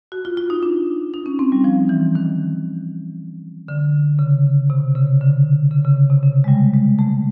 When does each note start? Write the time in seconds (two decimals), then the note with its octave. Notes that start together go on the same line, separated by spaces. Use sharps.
0.12 F#4
0.25 F4
0.37 F4
0.50 D#4
0.63 D4
1.14 D#4
1.26 C#4
1.39 C4
1.52 G3
1.64 F3
1.89 E3
2.15 D#3
3.68 D3
4.19 C#3
4.70 C3
4.95 C#3
5.21 D3
5.71 C#3
5.85 C#3
6.10 C3
6.23 C#3
6.44 G#3
6.48 G3
6.74 G#3
6.99 A3